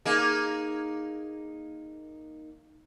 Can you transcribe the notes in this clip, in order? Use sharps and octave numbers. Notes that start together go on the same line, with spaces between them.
A#3 D#4 G#4